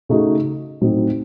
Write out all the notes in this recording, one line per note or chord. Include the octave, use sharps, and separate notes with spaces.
C#3 A3 D#4 F#4
A2 F#3 C4 D#4